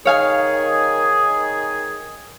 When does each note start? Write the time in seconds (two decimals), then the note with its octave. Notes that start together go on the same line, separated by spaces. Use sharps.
0.05 D#3 G#4 C#5 F5 G#5